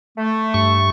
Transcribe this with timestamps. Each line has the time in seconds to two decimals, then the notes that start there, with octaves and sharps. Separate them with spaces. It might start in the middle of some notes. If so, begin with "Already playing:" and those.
0.18 A3
0.54 G2 C#6